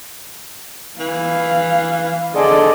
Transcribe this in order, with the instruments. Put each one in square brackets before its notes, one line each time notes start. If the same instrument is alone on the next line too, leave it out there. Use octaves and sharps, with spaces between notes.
[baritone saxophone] E3 [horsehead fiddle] F5
[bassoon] D3 [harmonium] G#4 A4 C5 [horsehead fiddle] D5 D#5